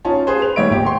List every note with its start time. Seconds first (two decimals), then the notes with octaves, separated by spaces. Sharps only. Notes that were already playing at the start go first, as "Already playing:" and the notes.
0.05 C#4 D#4 F4 A5
0.27 G#4 B4 C5
0.42 B4 F7
0.56 D#3 G3 C#5 D#5 E5 D7
0.70 E1 A#2 G4
0.85 G5 C6 C#6